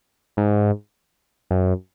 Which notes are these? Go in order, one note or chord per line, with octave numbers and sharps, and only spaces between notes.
G#2
F#2